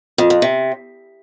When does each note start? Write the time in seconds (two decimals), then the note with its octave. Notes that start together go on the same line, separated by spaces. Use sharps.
0.18 F2
0.30 F2
0.42 C3